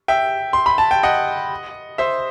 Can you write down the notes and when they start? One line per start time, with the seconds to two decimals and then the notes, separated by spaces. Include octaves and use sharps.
0.08 E5 G5
0.53 C6
0.66 B5
0.78 A5
0.91 G5
1.03 D#5 F#5
1.98 C5 E5